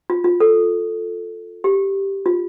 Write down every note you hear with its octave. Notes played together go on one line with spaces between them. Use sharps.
F4
F4
A4
G4
F4